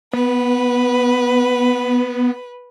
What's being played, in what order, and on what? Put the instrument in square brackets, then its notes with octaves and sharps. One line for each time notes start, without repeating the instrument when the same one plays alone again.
[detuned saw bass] B3 [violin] B4